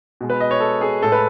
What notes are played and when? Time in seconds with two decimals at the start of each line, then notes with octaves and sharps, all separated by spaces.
0.21 B2 G#3
0.30 B4
0.40 D#5
0.51 C#5
0.60 A4
0.81 G#4
1.02 A2 G#3 A4
1.12 B4